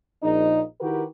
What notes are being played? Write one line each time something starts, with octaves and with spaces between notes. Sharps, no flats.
A#1 F3 D#4
D#3 E4 F#4 G4 A#4 B4